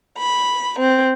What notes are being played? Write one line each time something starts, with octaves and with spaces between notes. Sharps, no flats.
B5
C4